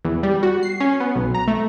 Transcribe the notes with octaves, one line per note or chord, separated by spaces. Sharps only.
E2
G3
F#4
C7
C#4
B3
B1
A#5
A3